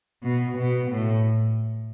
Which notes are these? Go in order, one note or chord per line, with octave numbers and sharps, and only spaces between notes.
B2
B2
A2